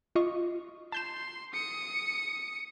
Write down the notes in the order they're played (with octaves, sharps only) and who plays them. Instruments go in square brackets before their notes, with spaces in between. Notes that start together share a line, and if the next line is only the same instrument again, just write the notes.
[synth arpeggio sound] F4 D#5 C#6
[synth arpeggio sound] A5 G6 E7 [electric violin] C6
[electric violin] D#6 C#7